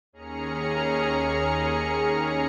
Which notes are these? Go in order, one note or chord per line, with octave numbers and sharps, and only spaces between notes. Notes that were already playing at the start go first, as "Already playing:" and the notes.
D#2 C#4 G#4 A#5 F6 C#7